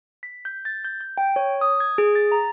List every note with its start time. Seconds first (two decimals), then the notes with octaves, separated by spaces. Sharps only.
0.23 B6
0.45 G6
0.65 A6
0.85 G6
1.01 G6
1.18 G5
1.36 C#5
1.61 D#6
1.80 G#6
1.98 G#4
2.15 A6
2.32 A#5